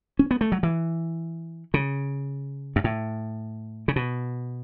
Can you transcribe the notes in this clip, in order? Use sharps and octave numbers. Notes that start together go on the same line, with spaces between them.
C#4
B3
A3
F#3
E3
C#3
F#2
A2
C#3
B2